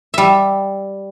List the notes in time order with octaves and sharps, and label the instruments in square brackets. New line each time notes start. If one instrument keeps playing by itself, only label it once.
[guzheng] G3 E5